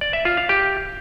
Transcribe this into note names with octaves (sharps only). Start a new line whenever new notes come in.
D5
E5
F4
F5
G4